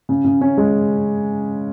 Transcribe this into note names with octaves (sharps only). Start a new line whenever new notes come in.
C#3
C#3
C#4
G#3